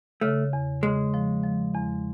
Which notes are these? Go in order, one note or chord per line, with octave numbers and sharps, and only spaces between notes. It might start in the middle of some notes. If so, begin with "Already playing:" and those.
C#3 A3
E2
C#3 G#3
F3
F3
E2